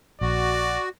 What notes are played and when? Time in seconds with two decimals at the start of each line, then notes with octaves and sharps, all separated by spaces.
0.21 A#1 F#4 D5